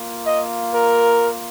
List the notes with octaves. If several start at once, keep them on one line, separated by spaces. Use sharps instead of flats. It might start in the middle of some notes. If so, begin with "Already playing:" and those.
Already playing: A#3 F4
D#5
A#4